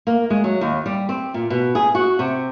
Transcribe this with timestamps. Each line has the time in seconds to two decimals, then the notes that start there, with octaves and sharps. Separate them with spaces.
0.07 A#3
0.30 G#3
0.44 F#3
0.61 D#2
0.86 G3
1.09 C4
1.34 A#2
1.50 B2
1.75 G#4
1.95 F#4
2.19 C3